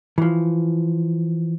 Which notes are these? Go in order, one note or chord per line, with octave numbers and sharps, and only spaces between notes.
E3 F3